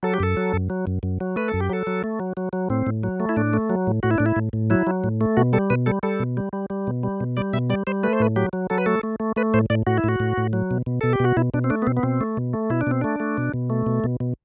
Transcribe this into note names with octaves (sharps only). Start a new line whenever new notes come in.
F#3 A4
G4
F#2 A4
F#3
F#2
F#3
F#2
F#2
F#3
A3 B4
A4
F#2
G4
F#3 A4
F#3
A3
F#3
F#3
F#3
A2 C4
A2
F#3
A3
E4
A2 D4
A3
F#3
A2
A2 F#4
E4
A2 D4
E4
A2
A2
F#3 E4
F#3
A2
A3
B2 F#4
G3 A4
B2 B4
G3 A4
G3 A4
B2
G3
G3
G3
B2
G3
B2
G3 D5
B2 E5
G3 D5
G3 C5
A3 B4
C5
A2 B4
F#3 G4
F#3
F#3 A4
B4
A3 A4
A3
A3
A3 B4
A2 C5
A2 D5
A2 F#4
E4
A2 F#4
A2
A2
F#3
B2
B2
B2 A4
G4
B2 F#4
B2 E4
B2 D4
C4
A3 D4
B3
B2 C4
B3
B2 C4
A3
B2
A3
B2 E4
D4
B2 C4
A3 D4
A3
B2
B2
A3
B2
B2
B2